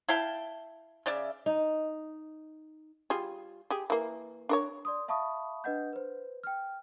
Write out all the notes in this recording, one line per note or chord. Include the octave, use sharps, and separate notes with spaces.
E4 F5 G5 A5
C#3 D5 E5
D#4
G3 F4 G#4
G4 G#4
E3 A#3
D4 A#4 C#5
D5 C6 D#6
E5 F5 A5 B5 C#6 D#6
D4 B4 D#5 F#5 G6
B4 C5
G5 F6